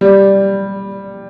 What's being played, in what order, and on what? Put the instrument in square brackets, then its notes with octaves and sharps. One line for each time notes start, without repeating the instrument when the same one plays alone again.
[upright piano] G3